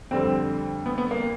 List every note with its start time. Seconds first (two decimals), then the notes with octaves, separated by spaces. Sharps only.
0.11 F2 D3 G3 C4
0.86 B3
0.98 B3
1.11 A#3